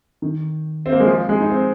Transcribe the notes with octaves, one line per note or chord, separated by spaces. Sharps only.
D#3
C4
A#3
G#3
F3
G#3
D#4
C4